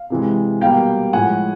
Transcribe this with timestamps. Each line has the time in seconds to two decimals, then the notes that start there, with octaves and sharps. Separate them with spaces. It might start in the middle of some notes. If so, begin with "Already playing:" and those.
Already playing: F5
0.10 C3 E3 G#3
0.61 B2 G3 A#3 F5 G5
1.13 A2 F3 G#3 F#5 G#5